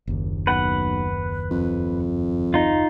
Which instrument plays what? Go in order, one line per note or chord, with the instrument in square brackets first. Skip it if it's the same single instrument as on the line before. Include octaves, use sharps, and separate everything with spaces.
[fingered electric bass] F#1 D#2
[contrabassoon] B1 [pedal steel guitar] B4 F#5
[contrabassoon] F2
[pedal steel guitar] D#4 F4